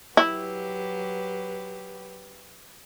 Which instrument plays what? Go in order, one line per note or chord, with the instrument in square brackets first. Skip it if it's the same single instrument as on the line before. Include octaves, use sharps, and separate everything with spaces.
[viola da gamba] F#3 G4 B4 [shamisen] E4